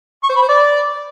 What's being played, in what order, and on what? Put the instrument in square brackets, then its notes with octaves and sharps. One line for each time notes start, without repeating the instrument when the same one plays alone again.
[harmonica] C#6
C5
B5
C5
D5